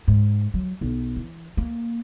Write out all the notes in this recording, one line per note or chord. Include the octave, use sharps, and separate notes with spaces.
G#2
F#3
B1
E3
A#3